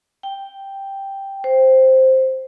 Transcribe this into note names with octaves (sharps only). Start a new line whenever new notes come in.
G5
C5